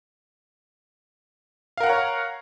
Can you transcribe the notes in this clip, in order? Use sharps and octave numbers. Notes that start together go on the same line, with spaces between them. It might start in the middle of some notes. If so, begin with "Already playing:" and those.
A#4 C#5 F5 F#5 A#5